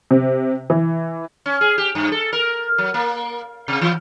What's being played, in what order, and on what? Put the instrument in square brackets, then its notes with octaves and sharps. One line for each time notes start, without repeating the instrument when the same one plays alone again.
[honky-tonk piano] C3
E3
[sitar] C#4
G#4
G4
G2
A4
A#4
F#3
A#3
C3
E3